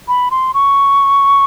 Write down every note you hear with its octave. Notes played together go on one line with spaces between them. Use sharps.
B5
C6
C#6